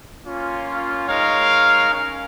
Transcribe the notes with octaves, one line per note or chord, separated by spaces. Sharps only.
A#3 C#4 F4
G#3 D#4 A#4 C#5 F5
C#4 A#4 F5